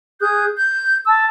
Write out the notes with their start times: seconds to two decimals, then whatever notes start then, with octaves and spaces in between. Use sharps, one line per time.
0.21 G#4 D#6 F#6 G6
0.58 G6
1.06 A5 E6